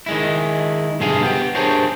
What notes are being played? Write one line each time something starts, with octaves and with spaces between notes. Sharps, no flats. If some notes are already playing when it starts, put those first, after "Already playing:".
D#3 G#3 E4
B1 G2 D3 G#4 F5 G#5
B3 G4
D4 G4 G#4 A#4 C5 C#5